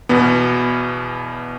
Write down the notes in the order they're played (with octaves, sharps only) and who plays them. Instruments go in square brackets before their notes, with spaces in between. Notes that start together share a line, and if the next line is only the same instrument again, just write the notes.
[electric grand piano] E2 B2 B3